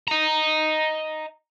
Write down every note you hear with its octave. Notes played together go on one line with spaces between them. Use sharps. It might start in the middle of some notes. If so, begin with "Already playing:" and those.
D#5 A#5